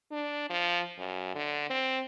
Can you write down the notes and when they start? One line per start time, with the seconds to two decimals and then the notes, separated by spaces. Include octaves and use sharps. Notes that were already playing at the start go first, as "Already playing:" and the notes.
0.11 D4
0.49 F3
0.99 F#2
1.35 D3
1.70 C4